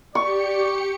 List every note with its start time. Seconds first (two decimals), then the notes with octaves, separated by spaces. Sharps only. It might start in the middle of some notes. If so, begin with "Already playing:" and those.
0.15 G4 D5 C#6 C#7